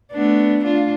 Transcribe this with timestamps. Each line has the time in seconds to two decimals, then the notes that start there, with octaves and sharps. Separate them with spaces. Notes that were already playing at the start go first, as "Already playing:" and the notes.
0.12 A3 B3 D4
0.64 D4 F4